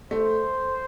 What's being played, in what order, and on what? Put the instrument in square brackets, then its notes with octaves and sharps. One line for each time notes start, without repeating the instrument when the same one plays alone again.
[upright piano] A3 [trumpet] C5